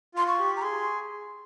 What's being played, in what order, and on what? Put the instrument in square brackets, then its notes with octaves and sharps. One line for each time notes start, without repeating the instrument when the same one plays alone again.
[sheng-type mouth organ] F4 [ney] C6
[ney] C#6
[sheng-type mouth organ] G4
[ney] A#5
[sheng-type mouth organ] G#4 [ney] C6